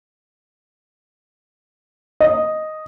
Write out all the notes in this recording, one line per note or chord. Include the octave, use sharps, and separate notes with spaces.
D#5